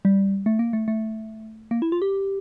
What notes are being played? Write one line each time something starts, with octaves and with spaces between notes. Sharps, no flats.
G3
A3
A#3
A3
A3
A#3
E4
F4
G4